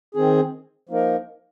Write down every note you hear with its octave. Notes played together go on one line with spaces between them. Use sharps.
D#3 C4 G#4
F3 A#3 D#4 A#4